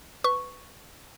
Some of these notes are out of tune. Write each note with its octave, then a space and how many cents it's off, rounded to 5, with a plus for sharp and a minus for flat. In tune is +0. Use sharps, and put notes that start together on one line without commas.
B4 +15 C#6 +0